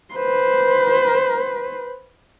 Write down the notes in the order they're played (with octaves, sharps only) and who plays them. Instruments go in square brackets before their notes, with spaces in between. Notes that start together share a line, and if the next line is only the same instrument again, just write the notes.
[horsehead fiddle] B4 C5